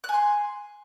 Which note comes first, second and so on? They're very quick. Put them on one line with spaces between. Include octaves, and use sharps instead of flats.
F#6 G#5 C6